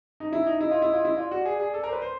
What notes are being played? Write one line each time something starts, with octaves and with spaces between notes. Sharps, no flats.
D#4
E4 E5
D#4
E4 D#5
F4
E4
F4
E4
F4 D5
F#4
G#4
G#4
A4
A#4
C5
B4
C5